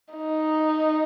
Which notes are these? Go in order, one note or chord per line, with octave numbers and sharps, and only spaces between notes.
D#4